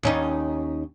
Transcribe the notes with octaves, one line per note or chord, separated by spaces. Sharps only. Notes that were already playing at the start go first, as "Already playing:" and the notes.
D#2 C#4 D#4